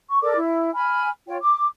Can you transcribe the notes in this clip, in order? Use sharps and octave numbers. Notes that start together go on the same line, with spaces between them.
C#6
A4 A#4 D5 D6
E4
G#5 B5 F6
F4 C#5 G5
D6